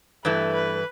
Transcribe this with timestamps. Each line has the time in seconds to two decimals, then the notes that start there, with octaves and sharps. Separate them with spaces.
0.24 G2 E3 A3 B4
0.53 B4